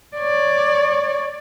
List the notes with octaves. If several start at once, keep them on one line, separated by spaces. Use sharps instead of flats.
C#5 D5